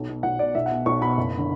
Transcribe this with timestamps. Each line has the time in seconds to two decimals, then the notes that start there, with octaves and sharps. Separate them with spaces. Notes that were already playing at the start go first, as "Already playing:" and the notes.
Already playing: B1
0.09 B2
0.23 B1 F#5
0.39 B2 D5
0.55 B1 E5
0.66 F#5
0.71 B2
0.86 B1 C#6
1.01 B2 B5
1.17 F#1
1.38 D3